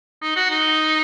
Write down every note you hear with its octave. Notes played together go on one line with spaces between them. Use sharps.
D#4
F#4
D#4